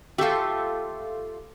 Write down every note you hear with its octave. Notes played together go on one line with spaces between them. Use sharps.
A3 F4 G4 A4